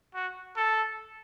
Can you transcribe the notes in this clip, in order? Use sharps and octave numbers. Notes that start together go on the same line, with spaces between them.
F#4
A4